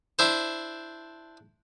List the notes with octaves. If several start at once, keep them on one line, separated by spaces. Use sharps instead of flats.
D4 E4 C5